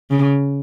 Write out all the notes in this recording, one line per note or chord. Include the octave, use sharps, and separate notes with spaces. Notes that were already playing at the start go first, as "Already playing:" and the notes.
C#3